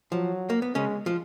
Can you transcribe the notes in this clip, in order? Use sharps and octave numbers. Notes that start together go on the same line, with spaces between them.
F3 F#3
A#3
B3
C#3 G#3 C#4
F3 F4